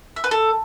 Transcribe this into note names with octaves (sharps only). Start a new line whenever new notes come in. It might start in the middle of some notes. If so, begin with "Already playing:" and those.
E5
B4
A4